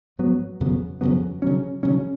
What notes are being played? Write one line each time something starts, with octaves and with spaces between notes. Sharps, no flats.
G#2 F#3 B3
F2 C#3 F#3 B3
F2 C#3 F#3 B3
C#3 F#3 C#4
C#3 F#3 C#4